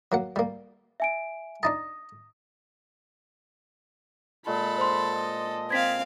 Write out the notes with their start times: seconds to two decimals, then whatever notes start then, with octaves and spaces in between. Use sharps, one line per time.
0.12 F#3 A#3 F#5
0.36 G3 A#3
1.00 E5 G#5 D7
1.63 D4 D#4 A5 D#6 A#6
4.47 A#2 G#3 A4 B5
4.78 C5 C6
5.17 D#5
5.71 C4 F5 G#6 B6